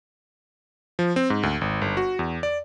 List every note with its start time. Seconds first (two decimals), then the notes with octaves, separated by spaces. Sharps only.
0.99 F3
1.16 C4
1.30 G#2
1.43 D2
1.61 G#1
1.82 G1
1.97 F#4
2.19 E2
2.43 D5